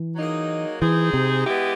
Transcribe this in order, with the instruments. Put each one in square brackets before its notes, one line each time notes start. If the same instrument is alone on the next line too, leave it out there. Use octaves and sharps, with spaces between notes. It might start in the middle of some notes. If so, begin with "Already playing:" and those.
Already playing: [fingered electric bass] E3
[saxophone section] F#3 A#3 D#4 G#4
[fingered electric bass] E3 [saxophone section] C4 D#4 G#4
[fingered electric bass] C3
[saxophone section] G#3 B3 E4 G4